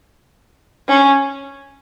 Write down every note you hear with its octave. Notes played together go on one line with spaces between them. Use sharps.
C#4